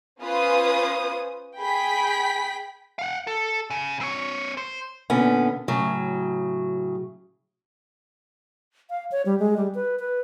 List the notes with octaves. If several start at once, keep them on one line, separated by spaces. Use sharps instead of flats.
C#4 F4 B4 C5 D#6
G#4 G5 B5 B6
F5 F#5
A4
C#3
C4 C#5
C5
A#2 D3 B3 C#4
A2 C#3 F#3
F5
C#5
G3
G#3
G3
B4
B4